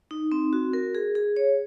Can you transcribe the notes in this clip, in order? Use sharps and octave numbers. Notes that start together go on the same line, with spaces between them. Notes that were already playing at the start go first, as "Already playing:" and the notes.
D#4
C4
F#4
A#4
G#4
G#4
C#5